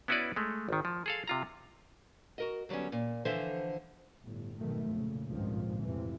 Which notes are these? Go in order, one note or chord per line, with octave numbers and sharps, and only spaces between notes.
B3 C#4 E4 F#4 B4 D5
G#3 A3
G#1 D#3
F3
G#4 A4 F5
C3 F4 A#5
F#4 A#4 D#5
D3 F#3 G3 B3 C#4
A#2
D3 E3 F3 A4 C5 E5
G1 A2
B1 F2 G#2 B2 D#3 A3
A#2 C#3
G#1 C#2 G2 A#2 D#3 F3
F2 A2 C3 E3